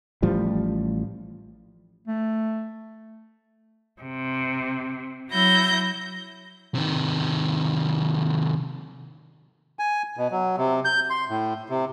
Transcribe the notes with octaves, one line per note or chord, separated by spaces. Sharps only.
A1 A2 F3 G3
A3
C3
F#3 E4 G6 A#6
C3 D#3
G#5
B2
F#3
C3
G6
C6
A2
C3